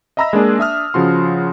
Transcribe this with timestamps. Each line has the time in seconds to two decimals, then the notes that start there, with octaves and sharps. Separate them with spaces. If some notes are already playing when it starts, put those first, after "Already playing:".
0.17 D#5 E5 A#5 B5 E6 A#6
0.33 G#3 A#3 D4 G#4
0.58 D4 E5 D#6 F6
0.94 C#3 F3 F#4 C6